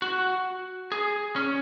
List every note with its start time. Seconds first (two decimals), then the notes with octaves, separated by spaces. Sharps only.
0.02 F#4
0.92 G#4
1.36 C#4